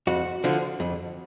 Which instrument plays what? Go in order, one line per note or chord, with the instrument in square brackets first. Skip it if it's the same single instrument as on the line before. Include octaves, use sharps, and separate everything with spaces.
[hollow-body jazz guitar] F2 F#4
D3 F3
F2